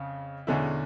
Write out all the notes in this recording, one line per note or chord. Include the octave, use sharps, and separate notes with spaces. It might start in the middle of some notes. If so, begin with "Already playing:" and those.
Already playing: F2 C#3
E2 B2 D3 G#3 C#4 E4